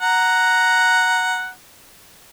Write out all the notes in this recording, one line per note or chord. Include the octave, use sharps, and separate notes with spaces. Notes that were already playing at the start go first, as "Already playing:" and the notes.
F#5 A#5